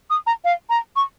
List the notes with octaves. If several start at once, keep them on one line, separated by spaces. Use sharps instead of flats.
D#6
A#5
F5
A#5
C#6